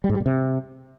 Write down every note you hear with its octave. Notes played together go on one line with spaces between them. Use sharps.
G3
G#2
G3
A#2
C3